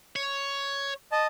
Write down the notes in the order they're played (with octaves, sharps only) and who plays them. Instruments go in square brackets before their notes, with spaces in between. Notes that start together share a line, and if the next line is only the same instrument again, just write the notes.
[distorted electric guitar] C#5
[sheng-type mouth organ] D#5 A5